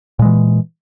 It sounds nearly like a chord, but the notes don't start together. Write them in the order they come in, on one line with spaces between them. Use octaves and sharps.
A#2 G#3 E3